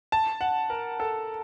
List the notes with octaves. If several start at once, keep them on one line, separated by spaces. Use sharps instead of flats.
A5
F#5
A#4
A4